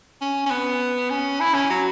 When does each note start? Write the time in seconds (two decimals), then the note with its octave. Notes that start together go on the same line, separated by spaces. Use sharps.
0.21 C#4
0.46 C#4
0.50 B3
1.10 C#4
1.41 E4
1.54 C#4
1.70 F#3